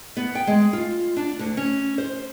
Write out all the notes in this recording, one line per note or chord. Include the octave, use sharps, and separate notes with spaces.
B3
G5
G#3
F4
D4
D2
C#4
C5